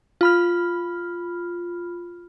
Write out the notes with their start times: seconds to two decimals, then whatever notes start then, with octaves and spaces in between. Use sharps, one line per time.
0.21 F4 B5 F6